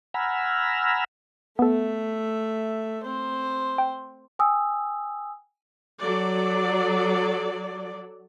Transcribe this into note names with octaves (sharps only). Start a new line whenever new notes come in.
F#5 G#5 A#5 B5 E6 F6
A3 B3 A4 E5
C4 C5
G5
G5 G#5 D#6 E6
F#3 A4 D5